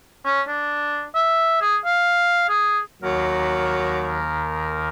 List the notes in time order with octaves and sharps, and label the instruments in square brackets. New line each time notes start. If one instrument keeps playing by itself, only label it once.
[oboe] C#4
D4
E5
G#4
F5
G#4
[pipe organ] D#2 D#3 A#4 [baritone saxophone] F#3